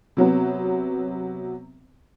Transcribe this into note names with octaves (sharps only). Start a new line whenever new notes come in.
C3 F#3 B3